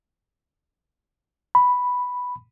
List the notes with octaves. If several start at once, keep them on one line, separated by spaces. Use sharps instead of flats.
B5